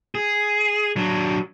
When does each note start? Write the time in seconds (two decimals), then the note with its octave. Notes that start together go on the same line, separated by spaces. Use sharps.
0.15 G#4
0.96 F#3 D4